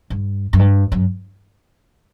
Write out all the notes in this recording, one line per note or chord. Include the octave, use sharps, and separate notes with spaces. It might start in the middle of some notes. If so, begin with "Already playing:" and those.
G2
F#2
G2
F#2